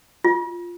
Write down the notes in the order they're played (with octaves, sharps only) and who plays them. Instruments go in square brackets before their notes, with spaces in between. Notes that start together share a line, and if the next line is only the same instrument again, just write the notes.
[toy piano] F4